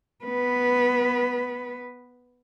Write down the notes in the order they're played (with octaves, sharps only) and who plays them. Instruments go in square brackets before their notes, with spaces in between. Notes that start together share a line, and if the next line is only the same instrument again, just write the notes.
[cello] B3 B4